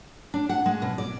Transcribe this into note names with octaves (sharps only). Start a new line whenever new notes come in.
D4
F#5
G#3
B2
D5